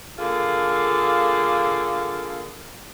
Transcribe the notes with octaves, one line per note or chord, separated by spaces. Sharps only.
D3 A#3 F4 G#4 A4